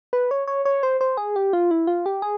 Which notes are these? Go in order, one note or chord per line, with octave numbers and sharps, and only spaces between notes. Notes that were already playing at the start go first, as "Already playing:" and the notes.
B4
C#5
C#5
C#5
C5
C5
G#4
G4
F4
E4
F4
G4
G#4